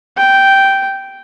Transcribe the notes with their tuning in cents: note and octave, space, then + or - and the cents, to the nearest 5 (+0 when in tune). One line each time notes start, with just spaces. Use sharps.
G5 -10